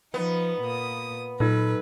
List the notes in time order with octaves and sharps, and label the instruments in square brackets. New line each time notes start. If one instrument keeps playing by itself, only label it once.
[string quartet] F3 D#4 [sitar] B3
[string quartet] A#2 A#3 D#6
[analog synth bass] A#2 [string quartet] F#3 B4 [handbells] D#4 A4